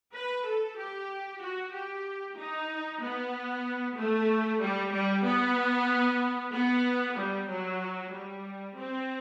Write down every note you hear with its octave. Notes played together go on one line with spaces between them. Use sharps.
B4
A4
G4
F#4
G4
D#4
B3
A3
G3
G3
B3
B3
G3
F#3
G3
C4